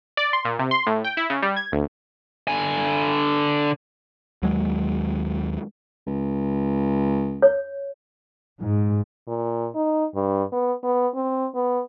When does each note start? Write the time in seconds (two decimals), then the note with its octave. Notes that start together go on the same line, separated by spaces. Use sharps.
0.17 D5
0.33 C6
0.45 A#2
0.59 C3
0.71 C6
0.87 A2
1.04 G5
1.17 E4
1.30 C#3
1.42 G3
1.57 G#6
1.72 D2
2.47 D3 G#5
4.43 D#2 F#3 G#3
6.07 C#2
7.42 C#5
8.61 G#2
9.27 A#2
9.75 D#4
10.14 G2
10.52 B3
10.83 B3
11.14 C4
11.55 B3